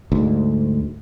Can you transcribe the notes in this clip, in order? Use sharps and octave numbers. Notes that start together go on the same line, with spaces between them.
D2 G#2